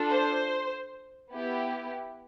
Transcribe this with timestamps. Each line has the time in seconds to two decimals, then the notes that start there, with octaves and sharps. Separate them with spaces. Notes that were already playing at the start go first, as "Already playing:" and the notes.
Already playing: D4 F4 A4
0.11 C5
1.30 B3 E4 G4